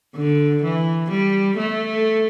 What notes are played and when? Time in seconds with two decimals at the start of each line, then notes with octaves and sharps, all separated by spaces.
0.15 D3
0.63 E3
1.10 G3
1.57 A3